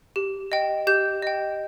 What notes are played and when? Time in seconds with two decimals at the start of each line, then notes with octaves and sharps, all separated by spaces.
0.16 G4
0.52 D#5 G5
0.87 G4 G6
1.22 D#5 G5